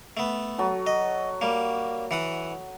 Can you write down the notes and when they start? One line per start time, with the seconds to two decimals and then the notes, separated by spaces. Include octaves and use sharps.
0.17 A3 B3
0.58 F#3 A4
0.87 D#5
1.41 G3 A#3
2.11 E3 F#5 D#6